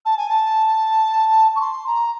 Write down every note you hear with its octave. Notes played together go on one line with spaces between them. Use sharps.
A5
G#5
A5
C#6
C6
A#5